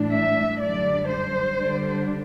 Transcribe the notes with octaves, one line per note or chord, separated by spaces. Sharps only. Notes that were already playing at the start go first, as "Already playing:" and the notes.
Already playing: A2 E3 G3 D4
E5
F#2 D3 G3 D4 D5
C5
D3 G3 D4